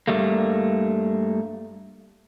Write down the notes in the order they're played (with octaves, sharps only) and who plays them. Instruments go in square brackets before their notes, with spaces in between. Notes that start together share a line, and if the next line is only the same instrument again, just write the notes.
[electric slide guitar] G2 G3 A3 A#3